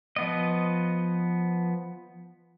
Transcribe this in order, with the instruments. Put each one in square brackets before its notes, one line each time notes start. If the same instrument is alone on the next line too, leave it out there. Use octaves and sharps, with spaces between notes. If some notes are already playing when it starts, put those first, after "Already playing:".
[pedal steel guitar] F3 B3 D#5